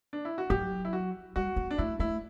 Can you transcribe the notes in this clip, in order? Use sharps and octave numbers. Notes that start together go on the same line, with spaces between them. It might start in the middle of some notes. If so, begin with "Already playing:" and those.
D4
E4
F#4
F#3 G4
E4
F#4
G3 F#4
B3
D4
A3 E4
A3 E4